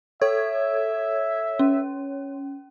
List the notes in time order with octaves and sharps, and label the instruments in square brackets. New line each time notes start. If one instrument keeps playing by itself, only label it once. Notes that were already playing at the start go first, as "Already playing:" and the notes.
[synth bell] A4 G#6 [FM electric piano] C#5 [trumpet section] E5
[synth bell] C#4